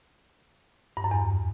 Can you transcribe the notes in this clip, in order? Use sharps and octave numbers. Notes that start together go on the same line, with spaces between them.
G2
F#2
E2